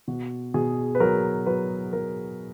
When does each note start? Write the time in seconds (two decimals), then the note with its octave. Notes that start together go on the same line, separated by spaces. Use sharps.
0.08 B2 F#4
0.54 B2 G#4
0.95 B4
1.00 F#3 A#4
1.46 F#3 B4
1.93 F#3 A#4